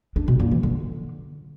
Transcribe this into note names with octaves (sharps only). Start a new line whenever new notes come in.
D4
B2
A#2
E3
D3